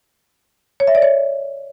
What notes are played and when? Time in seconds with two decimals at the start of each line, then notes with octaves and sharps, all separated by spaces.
0.80 C#5
0.87 E5
0.95 D5
1.02 C#5